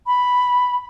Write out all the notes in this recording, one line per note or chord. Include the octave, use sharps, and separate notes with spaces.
B5